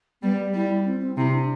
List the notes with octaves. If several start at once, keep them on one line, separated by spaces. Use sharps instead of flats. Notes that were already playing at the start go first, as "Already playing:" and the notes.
G3 B3
G3
G3 E4
E4
C4
C4
C3 E4
D4